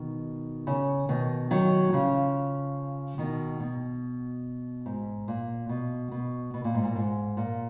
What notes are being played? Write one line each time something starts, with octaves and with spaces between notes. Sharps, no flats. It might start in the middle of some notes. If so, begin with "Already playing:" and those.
Already playing: B2 D#3
C#3
B2 D#3
D#3 F#3
C#3 F3
B2 D#3
B2
G#2
A#2
B2
B2
B2
A#2
G#2
A#2
G#2
A#2